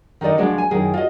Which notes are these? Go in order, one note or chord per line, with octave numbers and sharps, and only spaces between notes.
D#3 D#4 A4 D5 D#5
D2 G#2 F3 G#3 D4 F#4
G#5
F#2 D#3 E4 G#4
F4 F#4 D#5